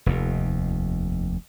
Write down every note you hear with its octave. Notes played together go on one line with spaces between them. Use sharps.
F1 D#2